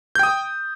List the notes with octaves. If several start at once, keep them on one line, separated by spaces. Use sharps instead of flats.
G5 D#6 G6